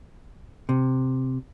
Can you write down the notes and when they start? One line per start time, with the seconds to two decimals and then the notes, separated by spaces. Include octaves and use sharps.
0.69 C3